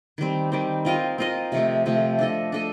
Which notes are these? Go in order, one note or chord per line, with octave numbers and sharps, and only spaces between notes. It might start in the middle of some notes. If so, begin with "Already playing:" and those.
D#3 G3 C4
D#3 G3 C4
C4 F4 A#4 D#5
C4 F4 A#4 D#5
C3 F3 A3
C3 F3 A3
D4 A4 D#5
D4 A4 D#5